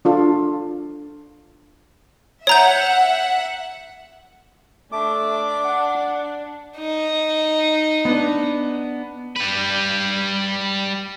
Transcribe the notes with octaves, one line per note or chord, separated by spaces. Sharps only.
D4 F4 A4
C#5 E5 F#5 A#5 G6
A3 D4 D6
F#5
D#4
B3 D4
G3 B4